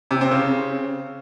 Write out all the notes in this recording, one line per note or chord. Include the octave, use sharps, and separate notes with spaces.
C3
C4
C#3